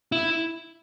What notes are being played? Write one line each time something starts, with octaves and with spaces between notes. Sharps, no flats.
E4